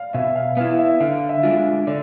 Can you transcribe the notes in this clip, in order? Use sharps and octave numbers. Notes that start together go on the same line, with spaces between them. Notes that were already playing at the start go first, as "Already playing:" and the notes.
Already playing: D5 F5
B2 E5
F5
B3 E4 F5
E5
D3 F5
E5
G#3 D4 F4
D3 D5